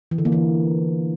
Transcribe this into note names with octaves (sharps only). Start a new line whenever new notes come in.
E3
D3
A#3
E3